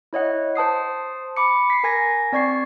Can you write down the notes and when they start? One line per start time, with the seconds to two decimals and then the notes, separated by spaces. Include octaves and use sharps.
0.13 E4 C#5 D#5 F#5
0.56 C5 A5 D#6 C7
1.36 B5 D6 C#7
1.70 B6 C7
1.84 A#4 G#5 G#6 A#6
2.32 C4 D5 C#6 G#6 C7